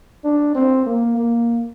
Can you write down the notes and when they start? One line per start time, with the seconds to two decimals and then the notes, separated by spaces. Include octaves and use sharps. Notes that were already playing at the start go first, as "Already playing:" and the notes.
0.24 D4
0.55 C4
0.86 A#3
1.17 A#3